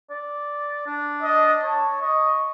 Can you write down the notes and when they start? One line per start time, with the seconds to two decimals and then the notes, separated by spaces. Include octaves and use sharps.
0.10 D5
0.86 D4
1.22 D#5
1.64 C#5 A5
2.02 D#5 C#6